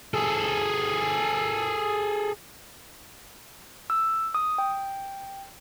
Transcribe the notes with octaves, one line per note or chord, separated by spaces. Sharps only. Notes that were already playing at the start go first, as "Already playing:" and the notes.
G#4 A4
E6
D#6
G5